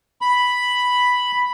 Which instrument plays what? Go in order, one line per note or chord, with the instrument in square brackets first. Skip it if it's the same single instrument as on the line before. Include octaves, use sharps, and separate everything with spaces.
[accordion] B5